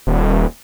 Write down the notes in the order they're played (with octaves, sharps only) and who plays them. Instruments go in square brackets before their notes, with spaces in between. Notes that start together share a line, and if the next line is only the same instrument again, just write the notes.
[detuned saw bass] D#1